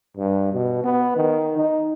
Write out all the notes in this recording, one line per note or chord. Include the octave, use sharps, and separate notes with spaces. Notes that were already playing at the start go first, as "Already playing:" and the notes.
G2
B2
B3
D#3
D#4